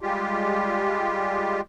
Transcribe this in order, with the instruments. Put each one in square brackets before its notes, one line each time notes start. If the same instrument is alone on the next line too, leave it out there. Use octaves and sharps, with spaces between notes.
[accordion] G3 G#3 F4 G4